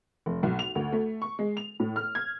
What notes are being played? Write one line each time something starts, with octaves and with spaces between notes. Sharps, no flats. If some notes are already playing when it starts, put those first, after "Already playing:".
F1
B1
F7
D2
A3
C#6
G#3
F7
A2
F6
G#6